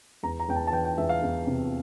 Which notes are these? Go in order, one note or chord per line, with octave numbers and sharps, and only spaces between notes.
E2 A#5
A#5
E2 G5
A5
A5
E3 G5
G5
E2 E5
F5
E2
C3